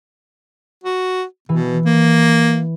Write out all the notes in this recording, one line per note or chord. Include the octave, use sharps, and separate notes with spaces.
F#4
B2 E3
A#3